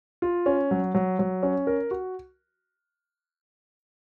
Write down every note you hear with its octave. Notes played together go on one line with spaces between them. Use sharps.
F4
C#4
F#3
F#3
F#3
C#4
A#4
F#4